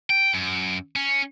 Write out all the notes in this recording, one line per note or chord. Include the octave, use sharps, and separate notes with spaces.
G5
F#2
C#4